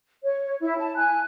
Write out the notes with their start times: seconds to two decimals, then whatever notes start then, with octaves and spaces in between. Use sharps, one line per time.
0.22 C#5
0.59 E4
0.77 A5
0.96 G#5 F#6